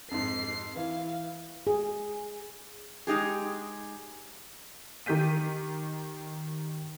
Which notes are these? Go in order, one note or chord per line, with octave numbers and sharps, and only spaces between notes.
F2 G#2 C7
E3 E4 F5
G#4
G#3 D#4 G4 G#4
D#3 G4 G6 B6 D#7